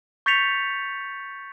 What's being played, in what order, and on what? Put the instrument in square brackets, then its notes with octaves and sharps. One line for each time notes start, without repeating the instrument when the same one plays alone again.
[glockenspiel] C#6 G6 A6 B6 C#7 F7